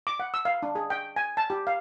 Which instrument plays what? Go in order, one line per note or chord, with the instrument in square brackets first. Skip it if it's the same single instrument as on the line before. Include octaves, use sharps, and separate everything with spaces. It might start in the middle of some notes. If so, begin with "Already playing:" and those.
[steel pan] D6
F#5
E6
F5
D4
G#4
G5
G#5
A5
G4
F5